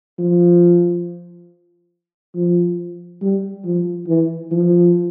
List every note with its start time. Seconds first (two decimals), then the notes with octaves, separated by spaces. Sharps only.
0.19 F3
2.35 F3
3.22 G3
3.65 F3
4.08 E3
4.51 F3